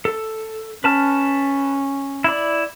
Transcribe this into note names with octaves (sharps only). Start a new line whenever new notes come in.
A4
C#4 B4 A5 F6
E4 D5